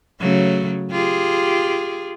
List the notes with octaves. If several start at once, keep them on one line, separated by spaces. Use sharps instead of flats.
C#3 F#3 A3
F4 G4 G#4